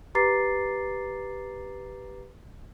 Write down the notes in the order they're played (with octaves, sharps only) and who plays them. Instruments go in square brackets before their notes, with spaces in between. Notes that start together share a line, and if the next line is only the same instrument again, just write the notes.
[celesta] G4 B4 A#5 D6 A6 C7